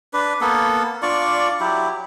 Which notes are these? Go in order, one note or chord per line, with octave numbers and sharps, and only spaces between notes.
D4 B4
A#3 B3 A4
D4 F4 D5 C#6
F#3 E4 G4